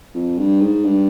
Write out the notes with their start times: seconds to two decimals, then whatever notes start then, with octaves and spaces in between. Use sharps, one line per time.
0.14 F2
0.38 G2
0.61 G#2
0.84 G2